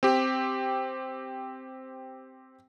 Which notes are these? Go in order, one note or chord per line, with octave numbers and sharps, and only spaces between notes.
C4 G4